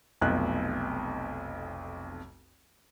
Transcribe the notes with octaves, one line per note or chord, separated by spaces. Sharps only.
F1 B1 F2 F#6